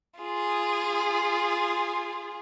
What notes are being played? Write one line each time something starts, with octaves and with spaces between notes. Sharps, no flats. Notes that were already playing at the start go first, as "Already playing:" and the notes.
F4 G#4